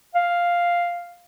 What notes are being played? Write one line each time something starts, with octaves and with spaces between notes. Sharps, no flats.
F5